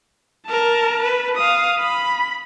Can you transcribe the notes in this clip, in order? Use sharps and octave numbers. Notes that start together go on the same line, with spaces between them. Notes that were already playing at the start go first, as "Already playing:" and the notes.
A#4 A5
B4
F5 D#6
B5